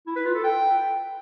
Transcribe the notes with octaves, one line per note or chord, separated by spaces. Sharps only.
E4
B4
F4
A4
G5